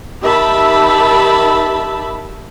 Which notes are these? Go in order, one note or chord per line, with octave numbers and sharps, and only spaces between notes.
D#3 G4 E5 A5 B5